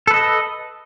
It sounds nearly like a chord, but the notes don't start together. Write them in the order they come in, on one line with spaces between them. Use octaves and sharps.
A4 B4 D#5